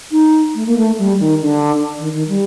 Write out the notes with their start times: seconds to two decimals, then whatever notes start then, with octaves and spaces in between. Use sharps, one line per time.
0.11 D#4
0.55 A3
0.66 A#3
0.77 A3
0.98 G3
1.19 D#3
1.41 D3
1.98 D#3
2.13 D#3
2.28 G3